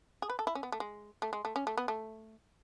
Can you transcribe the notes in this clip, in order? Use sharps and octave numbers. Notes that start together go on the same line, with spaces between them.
G#4
B4
A4
E4
C#4
B3
A3
G#3
A3
G#3
A3
C#4
A3
B3
A3